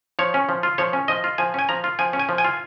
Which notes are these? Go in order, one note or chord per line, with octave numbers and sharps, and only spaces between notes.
F3 C#5
C#4
F3
F4
F3 C#5
C#4
F3 D#5
F4
F3 G#5
C#4 G#5
F3 A#5
F4
F3 G#5
C#4
G#5
F3
G#5
F4